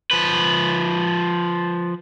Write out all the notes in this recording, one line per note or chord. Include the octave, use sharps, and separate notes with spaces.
F3 B4